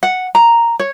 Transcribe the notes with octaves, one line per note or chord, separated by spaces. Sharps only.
F#5
A#5
C#5